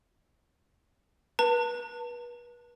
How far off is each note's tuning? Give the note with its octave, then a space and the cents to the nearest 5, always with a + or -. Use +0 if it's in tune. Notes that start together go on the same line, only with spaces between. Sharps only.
B4 -35 A5 +40